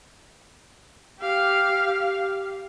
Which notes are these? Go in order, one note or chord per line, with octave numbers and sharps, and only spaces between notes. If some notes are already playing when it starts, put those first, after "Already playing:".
G4 F5